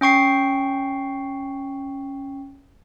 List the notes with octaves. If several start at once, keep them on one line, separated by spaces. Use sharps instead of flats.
C#4 G5 C#6 C7